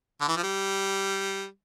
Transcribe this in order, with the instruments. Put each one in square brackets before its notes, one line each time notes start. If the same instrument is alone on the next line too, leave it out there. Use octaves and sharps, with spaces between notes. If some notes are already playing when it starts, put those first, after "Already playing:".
[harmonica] D3
E3
F3
G3